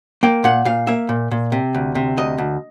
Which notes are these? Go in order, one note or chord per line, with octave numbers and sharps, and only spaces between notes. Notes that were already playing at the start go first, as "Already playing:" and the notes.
A#3 G5
A#2 F#5
A#2 F5
A#3 E5
A#2
A#2
C3
D2
C3
D2 D#5
D2